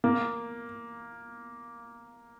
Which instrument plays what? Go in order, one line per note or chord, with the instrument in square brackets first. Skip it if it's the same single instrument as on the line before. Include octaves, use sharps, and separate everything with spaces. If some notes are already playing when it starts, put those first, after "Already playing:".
[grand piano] A#3